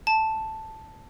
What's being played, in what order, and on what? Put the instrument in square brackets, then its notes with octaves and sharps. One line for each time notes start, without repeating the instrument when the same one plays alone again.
[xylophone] A5